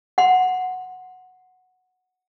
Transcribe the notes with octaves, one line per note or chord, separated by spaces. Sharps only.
F#5 C6